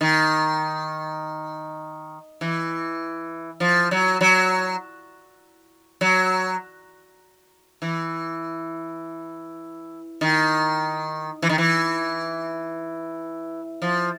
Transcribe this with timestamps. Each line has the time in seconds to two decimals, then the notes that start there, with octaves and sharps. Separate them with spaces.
0.01 D#3
2.41 E3
3.60 F3
3.91 F#3
4.21 F#3
6.01 F#3
7.82 E3
10.21 D#3
11.42 E3
11.49 D#3
11.58 E3
13.82 F3